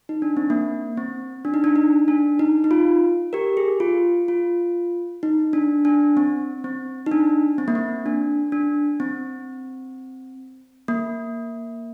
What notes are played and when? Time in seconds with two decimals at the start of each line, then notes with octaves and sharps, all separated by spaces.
0.09 D#4
0.22 D4
0.37 C4
0.50 A#3
0.97 C4
1.45 D4
1.54 D#4
1.64 D4
1.76 D#4
2.08 D4
2.39 D#4
2.64 D#4
2.71 F4
3.33 G4 A#4
3.57 G#4
3.80 F4
4.28 F4
5.23 D#4
5.53 D4
5.85 D4
6.17 C4
6.64 C4
7.06 D#4
7.12 D4
7.58 C4
7.68 A#3
7.75 C4
8.06 D4
8.52 D4
9.00 C4
10.88 A#3